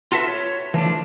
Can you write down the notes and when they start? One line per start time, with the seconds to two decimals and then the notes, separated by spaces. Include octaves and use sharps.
0.12 F4 F#4 A4 B4 E5
0.28 C#5
0.74 E3 F3 A3 D4